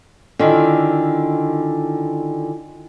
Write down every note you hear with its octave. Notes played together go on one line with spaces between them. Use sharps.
D3 D#3 E4 F4 G#5